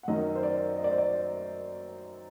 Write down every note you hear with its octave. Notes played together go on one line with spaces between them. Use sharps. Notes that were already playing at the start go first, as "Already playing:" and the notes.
F#5
F#2 D#3 F#3 D#5
C5
D5
D#5
D5
C5
D5